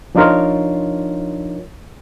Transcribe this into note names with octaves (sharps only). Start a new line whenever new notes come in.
F3 D4 D#4 F4 A#4 C#5